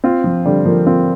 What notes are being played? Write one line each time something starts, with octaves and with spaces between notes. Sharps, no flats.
C4 F4
F3
D3 G3
F3 A#3
C4 F4